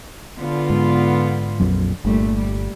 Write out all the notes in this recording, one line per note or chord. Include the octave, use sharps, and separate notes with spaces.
D3 B3 F4
G#2
A#1 F2 F#3
G1 A#2 G3 A3
G3